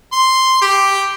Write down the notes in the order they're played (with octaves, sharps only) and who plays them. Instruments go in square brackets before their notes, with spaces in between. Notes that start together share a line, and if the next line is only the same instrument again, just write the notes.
[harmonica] C6
G4